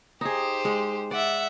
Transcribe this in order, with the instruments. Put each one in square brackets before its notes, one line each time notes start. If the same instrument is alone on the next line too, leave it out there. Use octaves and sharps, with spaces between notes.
[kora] D#4 G#4 [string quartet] G4 C5
[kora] G#3
[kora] D5 [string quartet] E5 F#5